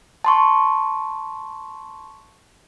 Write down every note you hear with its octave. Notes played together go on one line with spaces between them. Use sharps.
A5 C6 C#6